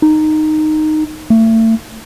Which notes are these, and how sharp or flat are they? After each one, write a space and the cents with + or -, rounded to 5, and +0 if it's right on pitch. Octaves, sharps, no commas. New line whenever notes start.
D#4 -10
A3 +35